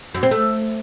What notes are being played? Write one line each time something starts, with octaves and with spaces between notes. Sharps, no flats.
F#2
C4
A3